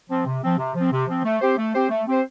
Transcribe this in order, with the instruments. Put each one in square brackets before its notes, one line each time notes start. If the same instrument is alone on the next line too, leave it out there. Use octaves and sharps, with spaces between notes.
[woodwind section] F3 C4
C3
F3 C4
C3
F3 C4
C3
F3 C4
A3
C4 G4 C5
A3
C4 G4 C5
A3
C4 G4 C5